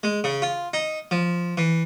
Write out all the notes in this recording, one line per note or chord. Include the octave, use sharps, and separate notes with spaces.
G#3
C#3
F4
D#4
F3
E3